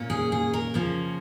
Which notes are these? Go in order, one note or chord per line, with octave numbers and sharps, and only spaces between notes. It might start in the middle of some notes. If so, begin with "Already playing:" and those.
Already playing: A#2 A#3 C#4
G#4
G#4
A#4
C#3 F3 A#3 C#4